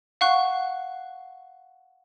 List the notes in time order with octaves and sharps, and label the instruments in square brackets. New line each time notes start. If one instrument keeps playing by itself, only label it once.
[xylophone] F5 F#5 C#6 F#6